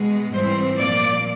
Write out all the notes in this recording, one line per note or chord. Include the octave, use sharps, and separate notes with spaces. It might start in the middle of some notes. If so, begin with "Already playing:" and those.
Already playing: B2 G#3 B3
G#2 E3 G3 C4 C5
A#2 F3 A#3 D5